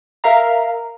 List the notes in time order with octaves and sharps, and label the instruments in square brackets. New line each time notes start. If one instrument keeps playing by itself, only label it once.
[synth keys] A#4 E5 F5 A#5